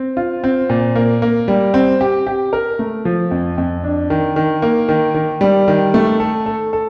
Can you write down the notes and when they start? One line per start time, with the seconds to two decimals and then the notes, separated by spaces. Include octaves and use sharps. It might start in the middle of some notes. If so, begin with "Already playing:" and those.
Already playing: C4
0.17 F4
0.44 C4
0.69 A#2
0.96 A#3
1.22 A#3
1.48 G3
1.74 C4
2.01 G4
2.27 G4
2.53 A#4
2.79 A3
3.05 F3
3.31 F2
3.58 F2
3.84 D4
4.10 D#3
4.36 D#3
4.62 A#3
4.88 D#3
5.14 D#3
5.41 G3
5.68 D#3
5.94 A3
6.20 A4
6.46 A4
6.73 A4